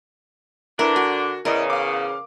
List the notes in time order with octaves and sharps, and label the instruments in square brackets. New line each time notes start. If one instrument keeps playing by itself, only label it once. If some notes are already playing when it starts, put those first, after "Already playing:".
[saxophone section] D3 D4 [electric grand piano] E4 B4 [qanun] A#4
[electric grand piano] F#4 [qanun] G#5
[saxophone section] E2 C#3 [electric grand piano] E4 D5 D#5 [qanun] A#4
[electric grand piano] F5 D6